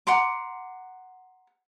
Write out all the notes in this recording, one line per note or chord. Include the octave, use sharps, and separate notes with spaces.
F#5 A#5 C6 D6